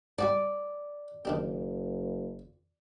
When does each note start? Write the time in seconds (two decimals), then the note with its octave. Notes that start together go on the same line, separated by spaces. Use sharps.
0.18 G3 F#4 D5 A5
1.25 F#1 D#3 D4 G4